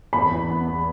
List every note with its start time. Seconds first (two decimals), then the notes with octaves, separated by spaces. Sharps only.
0.13 E2 B5
0.31 E3
0.49 B3
0.67 E2